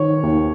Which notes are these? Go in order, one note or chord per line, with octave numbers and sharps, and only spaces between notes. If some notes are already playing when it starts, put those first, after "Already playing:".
Already playing: D#3 C#5
D#2